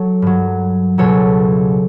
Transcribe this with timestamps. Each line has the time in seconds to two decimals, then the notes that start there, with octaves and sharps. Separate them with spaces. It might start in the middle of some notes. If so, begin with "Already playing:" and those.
Already playing: F#3 A4 C#5
0.22 G2 F#3
0.98 C#2 B2 F#3 A4 C#5